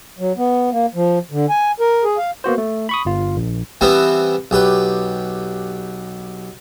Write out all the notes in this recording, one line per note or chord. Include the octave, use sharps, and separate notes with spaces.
F#3
B3
A#3
F3
D3
G#5
A#4
G#4
F5
A#3 B3 F#4 C5
A3
B5 C#6 D#6
G1 F4
A#1
E3 G3 B3 C4 E4
B1 G4 B4